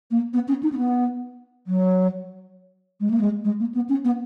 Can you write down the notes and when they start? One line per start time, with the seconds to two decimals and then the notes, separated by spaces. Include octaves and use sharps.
0.11 A#3
0.33 B3
0.48 C#4
0.63 D#4
0.72 C#4
0.77 B3
1.67 F#3
3.00 G#3
3.10 A#3
3.21 G#3
3.44 G#3
3.60 A#3
3.74 B3
3.89 C#4
4.04 B3